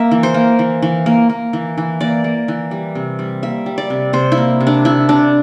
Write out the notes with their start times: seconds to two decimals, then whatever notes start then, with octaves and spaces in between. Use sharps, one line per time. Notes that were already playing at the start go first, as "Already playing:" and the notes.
Already playing: A#3 E5
0.11 E3
0.23 C5
0.34 A#3
0.59 E3
0.82 E3
1.06 A#3
1.29 A#3
1.53 E3
1.78 E3
2.01 A#3 D5
2.24 A#3
2.48 E3
2.71 G3
2.95 C3
3.19 G3
3.43 A#3 E5
3.66 G3
3.78 D5
3.90 C3
4.13 C3 C5
4.32 E4
4.37 A#3
4.60 C3
4.67 D4
4.85 C3 E4
5.09 C3 D4